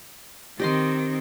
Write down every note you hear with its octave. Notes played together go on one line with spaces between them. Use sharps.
D#3 C4 G4 D#5 C6